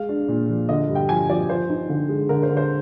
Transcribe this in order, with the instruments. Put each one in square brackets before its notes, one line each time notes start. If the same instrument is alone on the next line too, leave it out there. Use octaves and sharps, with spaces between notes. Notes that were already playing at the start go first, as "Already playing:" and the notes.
Already playing: [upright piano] G#3 F5
D4
A#2
F3
D3 D#5
G2
G5
F3 G#5
F3 D5
F3 C5
D#4
D3
G#3
D3 A#4
C5
D3
C5